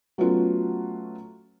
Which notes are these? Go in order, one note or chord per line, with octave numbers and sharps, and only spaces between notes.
F#3 A3 B3 C#4 F4 F#4